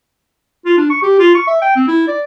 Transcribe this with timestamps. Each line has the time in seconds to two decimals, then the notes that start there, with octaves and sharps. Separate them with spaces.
0.65 F4
0.78 D4
0.90 C#6
1.02 G4
1.19 F4
1.35 C#6
1.47 E5
1.62 G5
1.76 C4
1.88 E4
2.08 D5